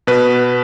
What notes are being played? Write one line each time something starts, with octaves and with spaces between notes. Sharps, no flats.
B2 B4